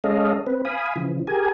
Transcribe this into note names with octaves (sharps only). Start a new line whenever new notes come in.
G#3 C#4 A4 D#5 F5
C4 B4
F5 G#5 B5 D#6
C#3 E3 F3
G4 G#4 A#4 G#5